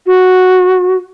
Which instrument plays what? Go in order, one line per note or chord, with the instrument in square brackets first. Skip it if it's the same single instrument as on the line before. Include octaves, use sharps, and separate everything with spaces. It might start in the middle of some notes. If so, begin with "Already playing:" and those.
[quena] F#4